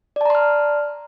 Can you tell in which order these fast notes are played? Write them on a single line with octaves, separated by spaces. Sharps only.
D5 A5 A#5 C6 F6